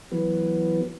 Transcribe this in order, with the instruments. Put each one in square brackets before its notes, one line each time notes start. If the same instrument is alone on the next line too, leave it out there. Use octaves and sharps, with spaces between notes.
[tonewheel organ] E3 F#3 B3